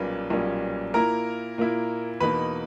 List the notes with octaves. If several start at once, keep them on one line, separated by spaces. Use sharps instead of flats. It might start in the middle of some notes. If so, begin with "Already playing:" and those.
Already playing: B1 A#2 G3 A#3 C#4 B4
B1 A#2 G3 A#3 C#4
A#2 A#3 E4 A#4 A#5
A#2 A#3 E4
E2 B2 A#3 D#4 B4 B5